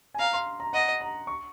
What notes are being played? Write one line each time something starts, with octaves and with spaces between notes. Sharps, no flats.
G#5
F5 A#5
C6
A#5
D#5 F#5
A#5
C#6